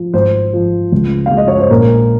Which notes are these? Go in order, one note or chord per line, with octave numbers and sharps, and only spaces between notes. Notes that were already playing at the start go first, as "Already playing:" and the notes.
Already playing: F3
G#1 C5
F3
C#2
F5
G#3
D#5
C#5
C5
A#1 A#4